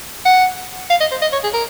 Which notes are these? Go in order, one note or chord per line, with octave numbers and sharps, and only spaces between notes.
F#5
F5
D#5
C5
D#5
C#5
G#4
A#4